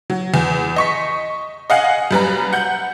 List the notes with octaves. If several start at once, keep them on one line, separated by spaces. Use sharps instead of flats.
F#3
E2
D#5 C#6 B6
D#5 F5 F#5 G#5
F#2 G3 B4 A#5
F#5 G6